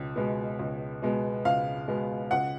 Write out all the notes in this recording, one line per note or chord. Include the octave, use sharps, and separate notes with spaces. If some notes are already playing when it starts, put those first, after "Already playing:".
Already playing: C#2 B2
B2 G#3 B3
C#2
B2 G#3 B3
C#2 F5
B2 G#3 B3
C#2 F#5